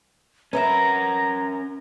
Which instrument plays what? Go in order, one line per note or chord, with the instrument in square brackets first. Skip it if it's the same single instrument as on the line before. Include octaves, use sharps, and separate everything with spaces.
[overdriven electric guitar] C#4 A#4 [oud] B4 D#5 E5 [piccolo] A#5